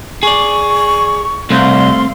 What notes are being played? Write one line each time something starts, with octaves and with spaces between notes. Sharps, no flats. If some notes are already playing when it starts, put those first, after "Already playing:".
G#4 D5 C#6
C2 A3 C4 F5 C6